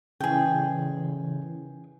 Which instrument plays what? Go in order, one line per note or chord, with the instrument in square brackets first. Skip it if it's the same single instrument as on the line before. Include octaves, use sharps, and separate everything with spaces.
[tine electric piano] C#3 E3 [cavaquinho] G#4 G5